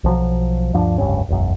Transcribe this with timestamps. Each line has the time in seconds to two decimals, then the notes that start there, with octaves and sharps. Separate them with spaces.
0.04 B1 F3 F#3
0.73 D2 G2 F3 D4
0.98 F1 C#2 G2 C#4
1.29 E1 B1 F#2